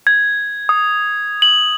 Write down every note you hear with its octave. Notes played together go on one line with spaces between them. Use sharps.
G#6
D#6
F#7